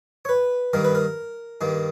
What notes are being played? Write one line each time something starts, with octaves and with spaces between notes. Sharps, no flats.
C#5
B4
G2 D#3 G3 A#3 A#4
B4
A#4
G2 D#3 G3 A#3